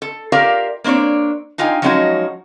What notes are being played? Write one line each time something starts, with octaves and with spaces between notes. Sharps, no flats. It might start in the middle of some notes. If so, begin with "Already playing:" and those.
A4
F4 G4 A#4 D5 E5 F5
A#3 C4 D4 C#5 D5
D4 D#4 F4 G5 G#5
F3 F#3 G#3 C#4 D#4 F#4